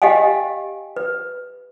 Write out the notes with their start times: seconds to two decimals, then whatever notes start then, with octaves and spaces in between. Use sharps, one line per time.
0.02 G4 D#5 F5 G5 G#5
0.96 B4